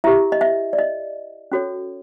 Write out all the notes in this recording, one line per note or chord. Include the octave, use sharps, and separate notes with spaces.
E4 G4 A#4 E5
D#5
E5
D5
D#5
C#4 F#4 A4 C#5